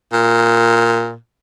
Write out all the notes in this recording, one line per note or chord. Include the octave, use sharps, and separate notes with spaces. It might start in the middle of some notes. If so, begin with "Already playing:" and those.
A#2